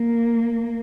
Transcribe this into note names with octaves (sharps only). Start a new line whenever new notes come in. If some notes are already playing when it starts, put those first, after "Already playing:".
Already playing: A#3